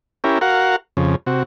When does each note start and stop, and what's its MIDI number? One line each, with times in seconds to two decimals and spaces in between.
0.24 0.39 61
0.24 0.39 64
0.24 0.39 67
0.24 0.39 70
0.41 0.76 66
0.41 0.76 70
0.41 0.76 77
0.41 0.76 78
0.97 1.16 41
0.97 1.16 49
1.27 1.43 48
1.27 1.43 66